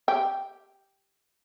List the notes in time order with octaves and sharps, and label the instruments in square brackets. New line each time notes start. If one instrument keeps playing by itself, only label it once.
[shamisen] G4